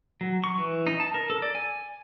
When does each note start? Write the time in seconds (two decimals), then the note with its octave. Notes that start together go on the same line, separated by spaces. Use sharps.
0.21 F#3
0.44 C#6
0.57 E3
0.87 D#4
1.00 A5
1.14 A#4
1.30 A4
1.42 D5
1.55 G#5